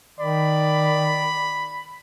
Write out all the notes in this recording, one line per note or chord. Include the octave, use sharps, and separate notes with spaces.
D#3 D5 B5